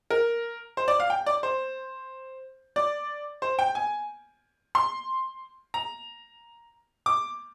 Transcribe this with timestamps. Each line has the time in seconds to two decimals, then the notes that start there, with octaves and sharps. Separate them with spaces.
0.10 A#4
0.77 C5
0.88 D5
1.00 F5
1.10 G5
1.26 D5
1.43 C5
2.76 D5
3.42 C5
3.59 G5
3.75 G#5
4.75 C6
5.74 A#5
7.06 D6